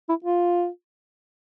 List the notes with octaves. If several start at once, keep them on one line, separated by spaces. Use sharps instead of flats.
E4
F4